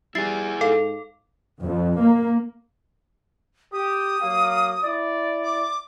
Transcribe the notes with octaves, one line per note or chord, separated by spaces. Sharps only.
G3 E4 G#4 A6 C7
G#2 A4 F5
F2
A#3
G4 D#6
F#3 A#3 F5
E4 D5
D6